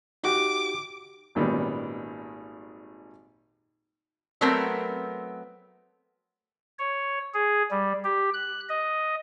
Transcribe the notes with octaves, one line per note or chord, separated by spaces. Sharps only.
D#4 F#4 G4 D6
G#1 A#2 D#3 G3 B3 C#4
F#3 A3 B3 C4 A#4
C#5
G#4
G3
G4
F#6
D#5